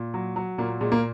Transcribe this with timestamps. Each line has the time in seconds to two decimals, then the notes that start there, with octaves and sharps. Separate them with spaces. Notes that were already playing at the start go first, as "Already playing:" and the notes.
Already playing: A#2
0.14 F#3
0.36 F#3
0.58 A#2 A#3
0.81 A#2 G#3
0.92 A#3